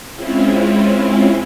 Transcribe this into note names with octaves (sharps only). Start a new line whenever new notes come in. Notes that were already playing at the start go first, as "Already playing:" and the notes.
G#3 C4 C#4 E4 F4